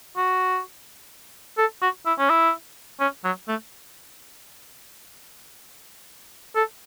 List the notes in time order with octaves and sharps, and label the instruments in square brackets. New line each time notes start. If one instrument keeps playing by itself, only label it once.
[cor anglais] F#4
A4
F#4
E4
C#4
E4
C#4
F#3
A3
A4